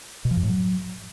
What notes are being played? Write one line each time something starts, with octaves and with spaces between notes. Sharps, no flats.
B2
F3
F#2
A2
F#3